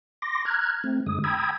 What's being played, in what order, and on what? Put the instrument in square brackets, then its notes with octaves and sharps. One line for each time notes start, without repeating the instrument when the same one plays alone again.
[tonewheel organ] C6 D6 A#6
A#5 F6 F#6 G#6
A3 C4
F#2 D3 G#3 D#6
G5 A#5 B5 D#6 E6 G#6